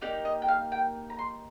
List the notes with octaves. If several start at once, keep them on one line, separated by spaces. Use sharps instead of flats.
A#3 D#4 G4 D5
D#5
G5
F5
G5
A#5
C6